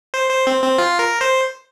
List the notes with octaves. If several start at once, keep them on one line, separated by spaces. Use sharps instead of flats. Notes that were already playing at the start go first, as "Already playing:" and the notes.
C5
C5
C4
C4
F4
A#4
C5